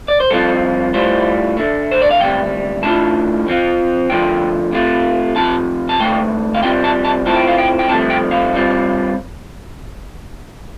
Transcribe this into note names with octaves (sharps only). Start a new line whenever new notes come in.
D5
C5
G2 F3 C4 F4 A4
A2 G3 F4 C5
D2 D3 A3
C5
D5
F5
D2 C3 G3 G5
A2 A3 D4 F4 A5
F2 F3 C4 F4
D2 D3 F3 F4 G5
C3 A3 F4
F2 C3 F3 C4 F4 A5
A5
D2 C3 A3 G5
F5
C3 G3 C4 F4 G5
A5
A5
A2 A3 C4 F4 A5
G5
F5
G5
G5
C2 C3 F3 A3 A5
G5
F5
G2 G3 C4 F4